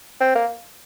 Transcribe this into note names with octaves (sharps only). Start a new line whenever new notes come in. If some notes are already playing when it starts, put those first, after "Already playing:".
C4
A#3